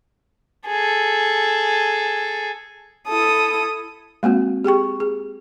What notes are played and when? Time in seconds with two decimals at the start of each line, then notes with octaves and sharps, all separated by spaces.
0.67 G#4 A4
3.08 E4 A4 D#6
4.23 G#3 A#3 C4 F#4
4.64 G4 G#4 G5 C#6
5.00 G#4